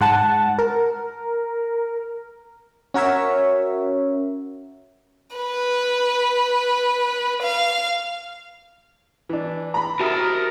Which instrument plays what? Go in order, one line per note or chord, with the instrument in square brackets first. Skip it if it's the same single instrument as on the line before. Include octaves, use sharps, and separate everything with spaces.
[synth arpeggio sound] G#2 F#5 A5
A#4
[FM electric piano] C#4 F#4 A#4 C#5 E5
[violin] B4
F5
[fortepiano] E3 D4
[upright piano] A#5 B5
[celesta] F#4 D#6 [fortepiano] G4 E5 [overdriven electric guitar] A#4 A5